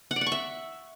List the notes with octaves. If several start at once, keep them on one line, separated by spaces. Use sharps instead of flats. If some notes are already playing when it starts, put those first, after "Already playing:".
F#5
D5
F#5
C#6
E5